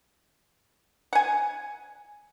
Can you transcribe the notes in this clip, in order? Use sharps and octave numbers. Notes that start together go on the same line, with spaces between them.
F#5 G#5